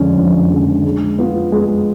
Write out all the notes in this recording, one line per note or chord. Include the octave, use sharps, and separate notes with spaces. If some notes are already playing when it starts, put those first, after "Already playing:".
Already playing: F2 D3 F3 G#3 C#4
F2
D3 F3 G#3 C#4
G#3
B3 F4
G#3